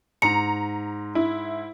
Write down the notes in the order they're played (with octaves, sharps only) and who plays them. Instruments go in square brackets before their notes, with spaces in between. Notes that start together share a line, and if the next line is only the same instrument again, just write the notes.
[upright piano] G#2 [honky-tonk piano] A#5 [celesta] C#7
[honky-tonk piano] E4